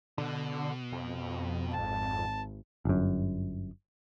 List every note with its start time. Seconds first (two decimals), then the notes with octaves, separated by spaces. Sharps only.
0.18 B2 D3
0.92 F2
1.74 G#1 A5
2.85 G1 F#2